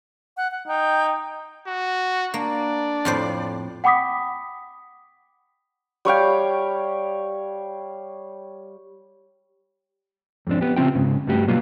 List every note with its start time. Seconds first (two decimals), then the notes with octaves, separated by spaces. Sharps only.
0.37 F#5
0.51 F#5
0.68 D#4 G5
1.67 F#4
2.34 A#3 D4 D5
3.05 F2 A2 C5
3.84 F#5 G5 B5 D6 D#6 B6
6.05 G3 C#5 F5 G5
10.47 F2 G#2 C4 D4
10.61 B3 G4
10.76 C#3 C4 F4 G5
10.95 G#2 C#3
11.27 G2 A3 F#4 G4
11.48 B2 F#3 G3 A#3 B3 F4